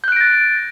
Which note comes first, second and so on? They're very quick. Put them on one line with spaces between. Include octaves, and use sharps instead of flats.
G6 F#6 D7 A#6 A6